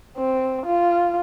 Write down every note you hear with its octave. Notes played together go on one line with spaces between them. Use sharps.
C4
F4